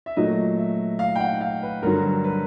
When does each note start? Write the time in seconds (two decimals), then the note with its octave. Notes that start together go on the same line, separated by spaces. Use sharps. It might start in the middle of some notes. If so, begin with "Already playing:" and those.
0.06 E5
0.17 A#2 F#3 A3 D#5
0.58 E5
0.99 F5
1.16 G5
1.20 F#5
1.41 F5
1.62 B4
1.83 G2 D3 F#3 A#4
2.24 B4